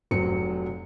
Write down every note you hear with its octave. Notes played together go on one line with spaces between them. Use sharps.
F1 F#3 C5 C#7